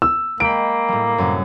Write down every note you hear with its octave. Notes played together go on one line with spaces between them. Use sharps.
E6
G#3 A#3 G5 B5 D7
A2 G3
F#2 A2 C3